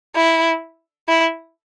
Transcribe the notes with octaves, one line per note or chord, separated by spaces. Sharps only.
E4
E4